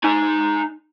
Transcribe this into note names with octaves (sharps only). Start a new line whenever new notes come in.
D#4 G#5